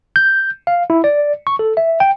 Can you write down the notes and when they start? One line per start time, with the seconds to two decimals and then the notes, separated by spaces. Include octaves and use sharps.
0.16 G6
0.67 F5
0.90 E4
1.04 D5
1.47 C#6
1.59 A4
1.77 E5
2.00 G5